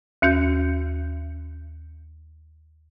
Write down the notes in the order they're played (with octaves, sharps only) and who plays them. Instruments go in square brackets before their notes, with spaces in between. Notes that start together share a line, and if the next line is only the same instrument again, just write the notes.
[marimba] D#2 C#4 F#4 G6